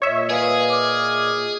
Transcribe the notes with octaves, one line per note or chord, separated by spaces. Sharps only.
A#2 C#5 D#5 E5
G#4 B4 F5
D6 F6